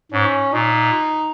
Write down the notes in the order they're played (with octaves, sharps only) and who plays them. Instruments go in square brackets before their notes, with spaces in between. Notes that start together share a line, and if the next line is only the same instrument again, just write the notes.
[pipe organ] G#2 [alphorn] C#4
[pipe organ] A#2 [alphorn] D#4